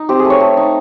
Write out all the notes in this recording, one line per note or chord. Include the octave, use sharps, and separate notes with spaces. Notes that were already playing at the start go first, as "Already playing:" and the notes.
Already playing: D#4
C4 G4
G#4
A3
C#5
A3
D#4